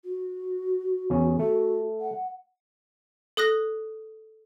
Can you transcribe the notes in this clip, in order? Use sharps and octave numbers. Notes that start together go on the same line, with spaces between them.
F#4
E2 C#4
A3 F#4
F#5
A4 D#6 F#6 A#6